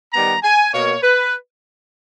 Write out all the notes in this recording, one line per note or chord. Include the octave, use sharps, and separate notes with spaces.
D#3 G3 B3 A#5
G#5
B2 A#3 C#5
B4